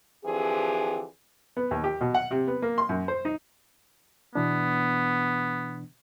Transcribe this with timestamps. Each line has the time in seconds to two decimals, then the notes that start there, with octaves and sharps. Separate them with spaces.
0.24 D3 E3 F3 C4 G4 G#4
1.57 B3
1.71 D#2
1.84 G4
2.01 B2
2.14 F#5
2.31 C3
2.47 B3
2.62 A#3
2.78 C6
2.89 F#2
3.08 C5
3.25 D#4
4.35 B2 E3 B3 D4